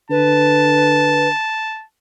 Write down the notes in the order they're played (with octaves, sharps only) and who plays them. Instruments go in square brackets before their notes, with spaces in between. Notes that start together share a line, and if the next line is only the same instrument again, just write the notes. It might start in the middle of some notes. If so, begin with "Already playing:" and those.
[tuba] D3 [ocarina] B4 [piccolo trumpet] A5